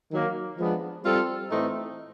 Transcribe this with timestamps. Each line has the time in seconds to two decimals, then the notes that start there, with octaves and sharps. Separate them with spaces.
0.11 D#3 F#3 A#3
0.58 F3 G#3 B3 D4
1.04 G3 C4 F4 A4
1.50 A2 E3 A3 C4 D#4